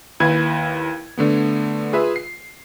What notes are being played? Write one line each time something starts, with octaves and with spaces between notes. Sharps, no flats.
D#2 E4 B4 F5 G#6
D3 A3 B3
F4 G#4 B4 E5
C7